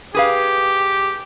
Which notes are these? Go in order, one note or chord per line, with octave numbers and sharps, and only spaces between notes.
G4 G#4 B4 F5